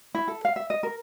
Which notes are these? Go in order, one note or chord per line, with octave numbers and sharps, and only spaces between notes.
E4
A4
F5
E5
D#5
A#4